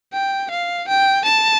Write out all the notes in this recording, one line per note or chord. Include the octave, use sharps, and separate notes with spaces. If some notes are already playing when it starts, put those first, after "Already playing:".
G5
F5
G5
A5